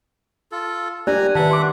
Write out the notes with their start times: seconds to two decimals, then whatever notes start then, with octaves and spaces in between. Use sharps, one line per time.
0.52 F4 A4
1.07 D4 G4 D5 G#5 A#5 F#6
1.35 D#3 B4 E5 F#5 A5
1.51 C6 D6